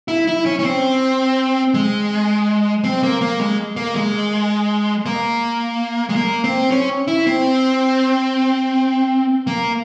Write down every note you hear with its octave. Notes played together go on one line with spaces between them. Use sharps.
E4
E4
C#4
C#4
C4
G#3
C4
A#3
A#3
G#3
A#3
G#3
A#3
G#3
A#3
C4
C#4
E4
C4
A#3